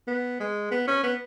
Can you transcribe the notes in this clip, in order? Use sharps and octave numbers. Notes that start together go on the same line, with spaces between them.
B3
G#3
B3
C#4
B3